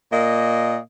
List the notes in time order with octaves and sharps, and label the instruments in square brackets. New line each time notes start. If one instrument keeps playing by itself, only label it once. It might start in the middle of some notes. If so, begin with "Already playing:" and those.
[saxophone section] A#2 A#3 D#5